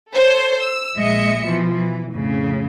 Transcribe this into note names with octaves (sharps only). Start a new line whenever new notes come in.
A4 C5 C#5
E6
A#1 G#3 D#5 E5 C#7
B2 E3 F3
E3
F2 A2 C#3